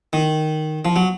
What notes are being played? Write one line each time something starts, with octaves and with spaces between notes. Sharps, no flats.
D#3
F3
F#3